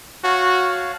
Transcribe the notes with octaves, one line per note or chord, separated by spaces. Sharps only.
F#4 C#5 F5 A5